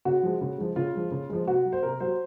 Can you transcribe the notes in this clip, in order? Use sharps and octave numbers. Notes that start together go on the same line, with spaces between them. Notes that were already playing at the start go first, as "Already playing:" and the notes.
C#3 F#4
F3 G#3
C#3
F3 G#3
C#3 F4
F3 G#3
C#3
F3 G#3
C3 F#4
F#3
C5
C3 A#4
F#3 C5